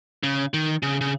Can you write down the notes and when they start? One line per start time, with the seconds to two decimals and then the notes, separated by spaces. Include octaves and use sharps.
0.23 C#3
0.54 D#3
0.83 C#3
1.01 C#3